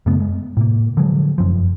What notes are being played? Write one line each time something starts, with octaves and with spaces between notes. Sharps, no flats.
F#2 C#3 A3 B3
G#3
A2 C3 A#3
D3 F3 F#3 G#3
F1 F#2 F3